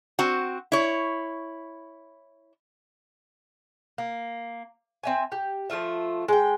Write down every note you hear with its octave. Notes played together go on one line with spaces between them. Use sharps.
C4 F#4
E4 C#5
A#3
C4 E5 G#5
G4
F3 A3 F4 E5
G#3 G5